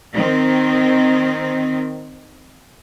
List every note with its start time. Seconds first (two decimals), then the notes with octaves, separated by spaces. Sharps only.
0.14 D#3 C4